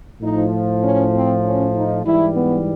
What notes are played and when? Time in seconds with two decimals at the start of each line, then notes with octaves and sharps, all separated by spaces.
0.22 A2 F3 D#4
0.83 C#4
1.14 C4
1.44 C#4
1.75 D#4
2.05 G#2 E3 G3 E4
2.36 B3